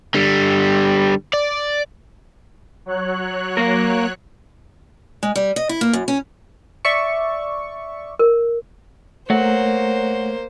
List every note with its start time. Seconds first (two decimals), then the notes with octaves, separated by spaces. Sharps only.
0.14 D3 G3
1.33 D5
2.86 F#3 C#5 F#6
3.57 A#3 A#4
5.23 G#3
5.36 G3
5.56 D#5
5.69 E4
5.81 A#3
5.93 F#2
6.08 C#4
6.85 D5 E5 C#6
8.19 A#4
9.30 A3 A#3 C5 C#5 F#5